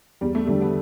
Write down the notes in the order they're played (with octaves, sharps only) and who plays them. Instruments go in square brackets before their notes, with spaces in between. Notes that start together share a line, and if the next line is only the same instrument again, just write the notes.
[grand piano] E2 [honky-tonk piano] G3
[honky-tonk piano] A3
[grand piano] D3 G3 D4 [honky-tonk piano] A3
[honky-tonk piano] B3